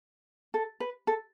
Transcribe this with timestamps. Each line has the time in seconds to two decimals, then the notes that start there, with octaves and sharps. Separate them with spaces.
0.54 A4
0.80 B4
1.07 A4